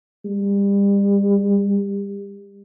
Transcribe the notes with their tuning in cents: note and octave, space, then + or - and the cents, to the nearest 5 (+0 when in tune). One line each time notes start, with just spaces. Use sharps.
G3 +30